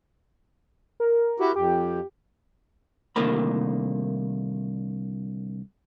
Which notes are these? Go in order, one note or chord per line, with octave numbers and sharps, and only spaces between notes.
A#4
E4 F#4 G4
F2 G4
C2 D3 D#3 A3 A#3 B5